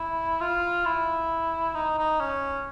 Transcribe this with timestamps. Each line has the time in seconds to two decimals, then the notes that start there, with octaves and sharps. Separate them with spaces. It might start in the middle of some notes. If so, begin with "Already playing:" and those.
Already playing: E4
0.41 F4
0.85 E4
1.75 D#4
1.98 D#4
2.20 C#4